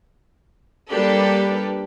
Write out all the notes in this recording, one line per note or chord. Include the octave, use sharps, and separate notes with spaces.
G3 A#3 D4 G4 A4 B4